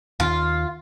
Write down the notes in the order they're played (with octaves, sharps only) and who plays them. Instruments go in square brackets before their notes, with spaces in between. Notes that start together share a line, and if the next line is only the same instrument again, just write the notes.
[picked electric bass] D#2 [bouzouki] F4